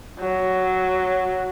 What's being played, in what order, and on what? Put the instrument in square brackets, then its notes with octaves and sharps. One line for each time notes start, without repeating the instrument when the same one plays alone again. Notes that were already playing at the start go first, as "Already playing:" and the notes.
[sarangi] F#3